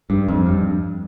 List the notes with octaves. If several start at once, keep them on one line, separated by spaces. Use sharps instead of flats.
G2
F2
G2